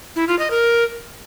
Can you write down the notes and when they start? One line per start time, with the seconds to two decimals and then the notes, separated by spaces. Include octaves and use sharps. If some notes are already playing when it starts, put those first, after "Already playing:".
0.16 E4
0.27 F4
0.39 D#5
0.51 A#4